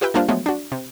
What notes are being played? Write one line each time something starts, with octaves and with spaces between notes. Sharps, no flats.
F4 G4 B4 E5 G5
G3 A#3 D4 F4 C5 F5
F3 F#3 G#3 A3 B3
D4 F#4
C3